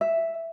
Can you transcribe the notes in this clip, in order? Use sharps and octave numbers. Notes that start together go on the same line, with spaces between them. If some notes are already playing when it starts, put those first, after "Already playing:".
E5